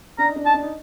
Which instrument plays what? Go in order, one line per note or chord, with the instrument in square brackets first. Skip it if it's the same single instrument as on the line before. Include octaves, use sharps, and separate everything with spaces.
[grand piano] D4 [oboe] A#5
[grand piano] D#4
D4
[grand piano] D#4 [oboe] A5
[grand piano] D4
D#4